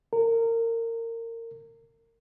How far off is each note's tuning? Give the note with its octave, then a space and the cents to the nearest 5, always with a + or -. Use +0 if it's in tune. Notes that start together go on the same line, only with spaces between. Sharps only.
A#4 -25